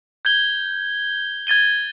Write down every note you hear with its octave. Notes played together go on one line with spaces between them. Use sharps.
G6 G#6 G7
G#6 A6 D#7 G7